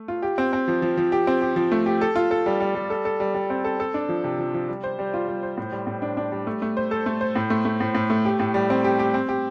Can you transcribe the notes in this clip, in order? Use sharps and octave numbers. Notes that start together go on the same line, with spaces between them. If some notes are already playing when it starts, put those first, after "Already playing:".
Already playing: A3
F4
G4
C4
C4
F3
F3
F3
G4
C4
G4
F3
A3
G4
A4
F4
A4
G3
G3
G3
A4
A4
G3
G3
C4
A4
A4
D4
F3
C3
F3
F3
G3
C5
G3
F4
G3
C5
A2
G3
A2
D4
D4
G3
A3
A3
C5
A4
A3
C5
A2
A3
A3
A2
A2
A3
G4
A2
G3
C4
G4
G4
C4
G4